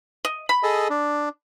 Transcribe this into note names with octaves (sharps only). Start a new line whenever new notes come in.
D#5
B5
G#4 A4 D#5
D4